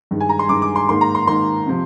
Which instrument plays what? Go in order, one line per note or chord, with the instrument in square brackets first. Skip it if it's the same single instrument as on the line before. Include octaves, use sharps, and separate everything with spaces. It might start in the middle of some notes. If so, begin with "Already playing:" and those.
[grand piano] G2 D#3 G#3
G#5
A#5
C6
G2 D#3 G#3 D6
D6
C6
G#2 D#3 A#3 C6
A#5
C6
G#2 D#3 A#3 C6
C3 F3